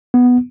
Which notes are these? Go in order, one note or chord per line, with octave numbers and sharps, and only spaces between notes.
B3